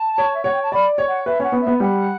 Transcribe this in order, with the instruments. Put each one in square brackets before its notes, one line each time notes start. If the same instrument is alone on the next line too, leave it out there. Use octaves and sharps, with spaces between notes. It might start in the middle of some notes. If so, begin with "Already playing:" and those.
Already playing: [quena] A5
[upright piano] C#5
[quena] E5
[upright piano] C#5 [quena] F#5
[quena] G5
A5
[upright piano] D5 [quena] B5
[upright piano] C#5
[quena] F#5
[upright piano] B4 [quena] E5
[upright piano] C#4 [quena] F#5
[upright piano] B3
[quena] E5
[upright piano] B3
[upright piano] G3 [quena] F#5